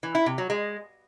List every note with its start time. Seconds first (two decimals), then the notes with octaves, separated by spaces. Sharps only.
0.03 E3
0.15 E4
0.26 C3
0.38 F#3
0.50 G#3